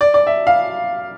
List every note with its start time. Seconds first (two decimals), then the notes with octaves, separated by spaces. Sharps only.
0.01 D5
0.14 D5
0.27 E5
0.47 F5